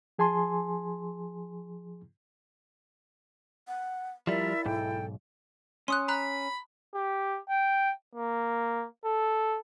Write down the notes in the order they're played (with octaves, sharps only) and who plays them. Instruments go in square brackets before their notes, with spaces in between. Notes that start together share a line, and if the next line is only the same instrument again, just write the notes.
[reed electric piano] F3 G#4 G#5 A5 C6
[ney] F#5
[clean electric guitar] F3 G3 [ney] E4 [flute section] A#4 D5 E5
[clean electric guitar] B1 G#2 [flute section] A4 G5
[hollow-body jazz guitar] C#4 [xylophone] C6 D#6 F#6
[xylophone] A#5 F#6 [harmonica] B5
[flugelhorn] G4
G5
A#3
A4